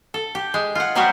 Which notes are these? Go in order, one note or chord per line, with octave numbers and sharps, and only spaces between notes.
A4
G4
G#3
F4 F#5
F#3 G3 B3 C4 F#4 G4